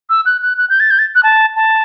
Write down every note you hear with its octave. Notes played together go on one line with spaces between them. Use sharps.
E6
F#6
F#6
F#6
G6
A6
G6
A6
F#6
A5
A5